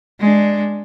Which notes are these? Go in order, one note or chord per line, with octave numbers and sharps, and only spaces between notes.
G#3 D4